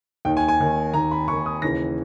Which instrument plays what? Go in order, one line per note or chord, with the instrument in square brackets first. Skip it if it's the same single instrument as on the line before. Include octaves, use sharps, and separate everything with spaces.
[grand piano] D#2 D#3 G5
G#5
G#5
D#2 D#3
D#2 D#3 A#5
B5
D#2 C#6
D#3
D#6
D#2 C#3 E3 A#6